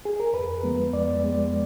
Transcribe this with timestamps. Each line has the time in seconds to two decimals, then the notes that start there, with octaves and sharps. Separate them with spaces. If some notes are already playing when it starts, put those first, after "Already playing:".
0.05 G#4
0.20 A#4
0.33 F2 B4
0.63 F3 G#3 B3
0.93 F2 D5
1.23 F3 G#3 B3